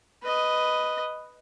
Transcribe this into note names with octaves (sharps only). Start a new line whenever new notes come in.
B4 D#5